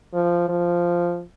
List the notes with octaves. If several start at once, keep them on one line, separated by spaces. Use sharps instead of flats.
F3
F3